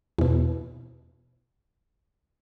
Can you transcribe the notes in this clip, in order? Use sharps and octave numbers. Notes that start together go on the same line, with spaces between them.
E2 B2